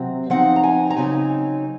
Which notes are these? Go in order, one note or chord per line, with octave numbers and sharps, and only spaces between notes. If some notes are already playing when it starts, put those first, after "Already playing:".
Already playing: C3 F#3 C4
F3 C4 D#4 F#5
A#5
G#5
A#5
C#3 F#3 C4 D#4 G#5